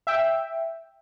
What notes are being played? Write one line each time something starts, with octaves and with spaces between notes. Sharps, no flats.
E5 G5